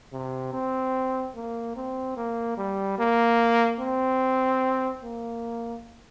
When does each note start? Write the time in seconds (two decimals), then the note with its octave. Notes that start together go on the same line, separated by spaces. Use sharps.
0.13 C3
0.53 C4
1.36 A#3
1.76 C4
2.17 A#3
2.58 G3
2.99 A#3
3.80 C4
5.03 A#3